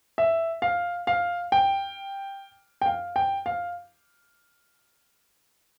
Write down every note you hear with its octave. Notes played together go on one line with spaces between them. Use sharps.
E5
F5
F5
G5
G5
F5
G5
F5